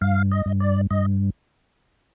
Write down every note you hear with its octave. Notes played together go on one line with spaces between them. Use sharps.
G2 F5
D#5
G2
D5
G2 D#5